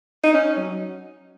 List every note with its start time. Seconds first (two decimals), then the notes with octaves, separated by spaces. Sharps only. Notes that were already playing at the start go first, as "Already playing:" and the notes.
0.23 D#4
0.35 C#4
0.57 F#3